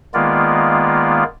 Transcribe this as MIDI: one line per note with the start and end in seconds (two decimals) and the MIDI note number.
0.14 1.24 51
0.14 1.24 56
0.14 1.24 58
0.14 1.24 59
0.14 1.24 65
0.14 1.24 74